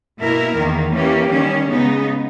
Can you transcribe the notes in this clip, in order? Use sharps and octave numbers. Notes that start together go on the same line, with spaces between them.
B2 A#3 E4 A#4
E2 D#3 A#3
E3 A#3 C#4 G4
D#3 G3 C#4
C#3 G#3 B3 D#4